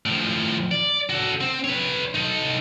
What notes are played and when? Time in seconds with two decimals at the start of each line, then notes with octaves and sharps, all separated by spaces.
0.06 A2 F3
0.71 D5
1.09 F#4 A4
1.41 C4
1.64 B4 C#5
2.15 D#4 A4